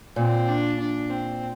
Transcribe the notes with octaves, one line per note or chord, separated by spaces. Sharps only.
A#2 C4
D4
D4
C4